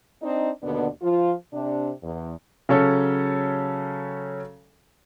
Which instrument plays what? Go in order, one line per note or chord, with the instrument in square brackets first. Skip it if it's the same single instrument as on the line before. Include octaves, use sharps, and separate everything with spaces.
[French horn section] C4 D4 D#4
D#2 B2 D3 B3 D4
F3 F4
C3 D4
E2
[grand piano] C#3 F#3 C#4 A4 C#5